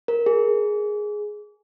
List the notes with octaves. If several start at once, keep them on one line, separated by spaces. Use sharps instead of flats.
A#4
G#4